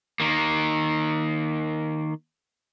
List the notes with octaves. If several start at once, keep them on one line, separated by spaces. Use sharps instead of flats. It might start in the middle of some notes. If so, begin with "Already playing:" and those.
D#3 A#3